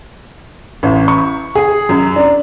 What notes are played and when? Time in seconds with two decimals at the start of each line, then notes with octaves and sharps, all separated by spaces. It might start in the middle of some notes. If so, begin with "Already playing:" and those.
0.83 A1
1.08 C#6
1.55 G#4
1.89 F#2
2.16 D4